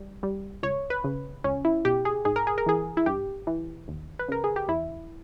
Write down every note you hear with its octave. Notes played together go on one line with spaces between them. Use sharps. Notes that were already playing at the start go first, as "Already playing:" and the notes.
Already playing: G3
G3
C#2 C#5
B4
C#3
C#2 C#4
E4
B2 G4
G#4
G#2 G#4
A#4
G#4
A#4
E3 G#4
E4
G2 G4
E3
D#2
B4
C#3 A#4
G#4
G4
E2 E4